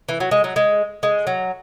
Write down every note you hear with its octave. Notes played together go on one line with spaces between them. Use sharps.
E3
F#3
G#3
F#3
G#3
G#3
F#3